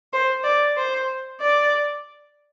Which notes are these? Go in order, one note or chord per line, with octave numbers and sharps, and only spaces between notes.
C5
D5
C5
D5